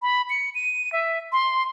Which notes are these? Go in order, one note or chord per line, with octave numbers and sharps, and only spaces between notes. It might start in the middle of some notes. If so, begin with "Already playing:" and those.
B5
C#7
D#7
E5
C6